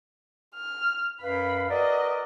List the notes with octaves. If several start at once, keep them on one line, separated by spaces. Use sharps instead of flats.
F6
F#2 B4 F5 B5
F#4 A#4 B4 D5 D#5